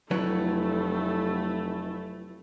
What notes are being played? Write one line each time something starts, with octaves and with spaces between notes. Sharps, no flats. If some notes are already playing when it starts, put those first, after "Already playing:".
F1 F#3 A3 E4 B4 C#5